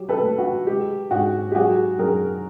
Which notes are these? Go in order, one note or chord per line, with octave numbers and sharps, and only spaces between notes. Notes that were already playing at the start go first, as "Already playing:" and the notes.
Already playing: F#3 G4
A4 B4
A3
F#4
G#3 G4
G#2 F#4 G#4
G4
F#3 F#4 G#4
F#2 G#4 A#4